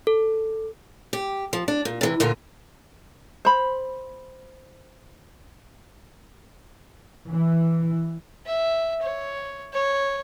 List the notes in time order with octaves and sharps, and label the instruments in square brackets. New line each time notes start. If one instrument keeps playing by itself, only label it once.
[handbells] A4
[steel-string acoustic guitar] G4
F3
D4
A#2
C3 E3
D2 A#2 D3 F4
[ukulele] C5 B5
[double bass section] E3
[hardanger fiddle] E5
C#5
C#5